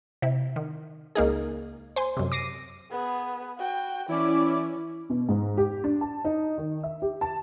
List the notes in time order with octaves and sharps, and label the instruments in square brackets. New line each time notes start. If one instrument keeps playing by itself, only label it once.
[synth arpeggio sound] C3 E4
D#3
C#2 A#3 D#4 G#4
C5 G#5 C6
F#2 C3
D6 A#6 C7 D#7
[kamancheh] B3 G#4
F#4 G5
[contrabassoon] E3 [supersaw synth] C#4 E4 [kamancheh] D5 D6
[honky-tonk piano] B2
G#2
G4
D4
A5
D#4
D#3
E5
G4
A5